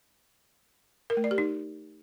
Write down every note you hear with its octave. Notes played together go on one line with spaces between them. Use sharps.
A#4
A3
D5
G4
D#4